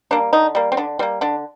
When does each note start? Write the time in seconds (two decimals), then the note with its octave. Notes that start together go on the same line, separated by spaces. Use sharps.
0.11 G3 A#3 D4
0.33 D3 D#4
0.55 G3 A#3
0.72 C4
0.77 D3 D4
0.99 G3 C4
1.03 A#3
1.21 D3 D4